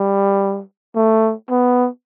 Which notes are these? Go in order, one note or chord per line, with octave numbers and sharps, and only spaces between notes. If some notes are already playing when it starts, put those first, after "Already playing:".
Already playing: G3
A3
B3